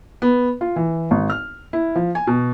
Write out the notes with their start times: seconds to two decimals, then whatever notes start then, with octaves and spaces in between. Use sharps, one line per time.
0.22 B3
0.61 F4
0.76 E3
1.11 G#1
1.30 F6
1.73 E4
1.95 F3
2.15 G#5
2.27 B2